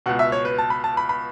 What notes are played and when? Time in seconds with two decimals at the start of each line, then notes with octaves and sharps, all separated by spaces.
0.06 C#2 B2 F#5
0.19 E5
0.32 C#5
0.45 B4
0.58 A5
0.70 B5
0.84 A5
0.97 B5
1.09 B5